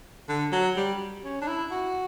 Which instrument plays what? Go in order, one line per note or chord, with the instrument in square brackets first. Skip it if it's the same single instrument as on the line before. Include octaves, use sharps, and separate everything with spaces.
[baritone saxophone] D3
F#3
G3
C#4
D4
E4
F#4